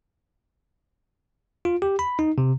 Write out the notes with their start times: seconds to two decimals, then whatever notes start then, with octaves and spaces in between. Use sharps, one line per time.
1.65 F4
1.82 G4
1.99 B5
2.19 D#4
2.38 C3